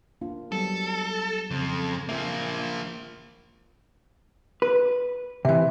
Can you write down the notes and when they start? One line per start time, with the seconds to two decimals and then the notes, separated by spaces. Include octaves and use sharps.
0.21 A#3 D4 F4
0.52 F#3 G3 B3 A4
1.51 F2 C#3
2.09 F3 A#3 E5
4.62 B4
5.45 C3 E3